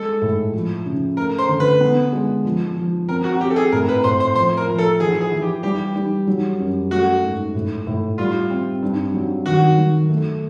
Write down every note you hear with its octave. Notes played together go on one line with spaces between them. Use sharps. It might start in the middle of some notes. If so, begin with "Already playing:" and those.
Already playing: G#3 A4
A2
F3
C#3
A3 A#4
C5
D3
B4
B3
G#3
F3
F3
C4 A#4
F#4
C4 G4
A4
G#4
A2 A#4
B4
A2 C5
C5
F3 C5
A#4
F3
A4
E3 G#4
G#4
E3
G4
G3 G4
G3
F#3
F#2
A3 F#4
G#2
A2
A2
G3 F4
C4
G2
F#3
D#3 F#4
F#3
A3